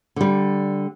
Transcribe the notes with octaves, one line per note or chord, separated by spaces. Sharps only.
D3 G3